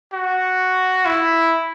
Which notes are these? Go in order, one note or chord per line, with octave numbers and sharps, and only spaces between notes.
F#4
E4